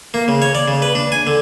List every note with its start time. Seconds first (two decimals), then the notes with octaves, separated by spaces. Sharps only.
0.14 A#3
0.28 C#3
0.42 C#5
0.55 D5
0.68 C#3
0.82 B4
0.95 D4
1.12 G#5
1.27 D3